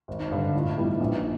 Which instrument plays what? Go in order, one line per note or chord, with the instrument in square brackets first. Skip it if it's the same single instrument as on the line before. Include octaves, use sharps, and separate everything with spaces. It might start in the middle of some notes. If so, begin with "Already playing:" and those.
[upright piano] G#1
[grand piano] D#4
[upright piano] G2 D3
[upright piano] A2 [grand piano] F4
[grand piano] E4
[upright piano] E3 G3 B3
[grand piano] D#4
[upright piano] A#1 [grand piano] D4
[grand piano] D#4